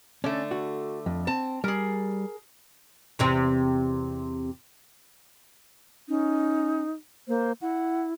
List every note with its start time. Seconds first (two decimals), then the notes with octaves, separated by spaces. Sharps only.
0.24 D3 A3 C#4
0.51 F#4
1.06 F2
1.27 C4 A5
1.64 G3 G#4 A#4
3.19 E2 C3 C4
6.09 C#4 D#4
7.28 A#3 C5
7.62 E4 F#5